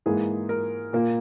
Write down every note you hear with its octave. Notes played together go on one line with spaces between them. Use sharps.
G#2 E3 A#3 G#4
A#4
A#2 A#3